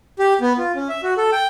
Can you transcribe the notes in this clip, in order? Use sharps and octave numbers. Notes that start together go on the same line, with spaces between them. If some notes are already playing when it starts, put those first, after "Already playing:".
G4
B3
F4
C#4
E5
F#4
A4
G5